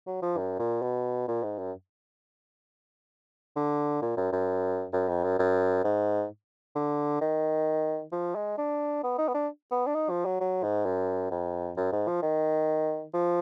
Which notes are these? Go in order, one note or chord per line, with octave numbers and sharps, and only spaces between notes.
F#3
F3
F#2
A#2
B2
A#2
G#2
F#2
D3
A#2
F#2
F#2
F#2
F2
F#2
F#2
G#2
D3
D#3
F3
G#3
D4
B3
D#4
B3
D4
B3
D4
D#4
F3
F#3
F#3
G#2
F#2
F2
F#2
G#2
F3
D#3
F3